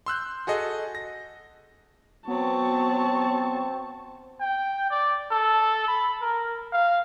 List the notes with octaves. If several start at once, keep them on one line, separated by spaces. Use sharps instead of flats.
C6 E6 F#6 G6
F#4 G#4 A4 D#5
A#6
F#3 B3 C4 A5 C#6
G5
D5
A4
B5
A#4
F5